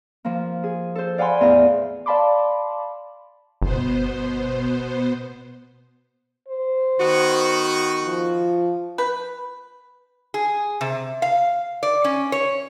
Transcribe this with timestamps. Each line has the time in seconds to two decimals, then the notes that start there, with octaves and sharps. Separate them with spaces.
0.25 F3 A#3
0.64 G#4
0.95 A4 C5
1.18 D5 F5 F#5 G#5 B5 C6
1.41 E2 A2 G#4 F5 A#5
2.06 D5 F5 A5 B5 C6 D6
3.62 G1 B2 B3 C5
6.48 C5
6.99 D#3 B3 F#4
8.05 F3
8.98 B4
10.34 G#4
10.81 C3
11.22 F5
11.83 D5
12.04 C#4
12.32 C#5